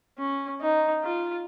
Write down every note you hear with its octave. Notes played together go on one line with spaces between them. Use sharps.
C#4
D#4
F4